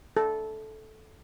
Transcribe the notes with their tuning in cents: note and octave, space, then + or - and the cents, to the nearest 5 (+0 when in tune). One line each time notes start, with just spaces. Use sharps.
A4 -10